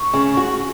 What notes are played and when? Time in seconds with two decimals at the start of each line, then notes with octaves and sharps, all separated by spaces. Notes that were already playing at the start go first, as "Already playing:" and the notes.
Already playing: C#6
0.14 C#3
0.37 F#4